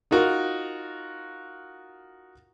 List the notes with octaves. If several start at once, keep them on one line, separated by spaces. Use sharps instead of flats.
D#4 F4 F#4 A#4